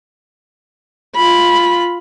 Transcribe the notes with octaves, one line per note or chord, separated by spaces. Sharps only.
F4 B5